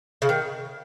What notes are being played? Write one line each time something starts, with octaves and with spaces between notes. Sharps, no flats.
C#3
D#3